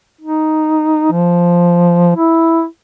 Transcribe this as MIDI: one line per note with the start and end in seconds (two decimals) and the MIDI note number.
0.21 1.11 63
1.12 2.14 53
2.16 2.65 64